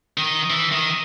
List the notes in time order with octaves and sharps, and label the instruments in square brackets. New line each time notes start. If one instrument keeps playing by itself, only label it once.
[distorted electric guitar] D#3
E3
D#3